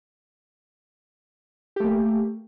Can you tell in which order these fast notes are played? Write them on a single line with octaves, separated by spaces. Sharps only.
G4 A3 A#3